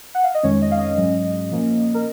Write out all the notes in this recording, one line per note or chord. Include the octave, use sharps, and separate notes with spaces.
F#5
F5
D#5
F2 D#3 G#3 C#4 C#5
D#5
F5
D#5
G#2 F#3 C#4
A#2 F3 A#3 C#4
A#4